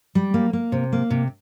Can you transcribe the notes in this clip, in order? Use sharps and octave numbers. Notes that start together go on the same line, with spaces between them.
G3
A#3
A#3
C3
A#3
C3